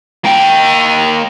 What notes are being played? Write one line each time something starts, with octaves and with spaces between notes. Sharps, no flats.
A#3 G5